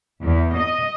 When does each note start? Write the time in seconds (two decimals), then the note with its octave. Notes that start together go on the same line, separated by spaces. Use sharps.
0.22 E2
0.55 D#5